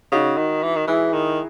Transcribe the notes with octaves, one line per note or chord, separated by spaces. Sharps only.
C#3 D#4 F#4
D#3
E3
D#3
E3 E4 G#4
D#3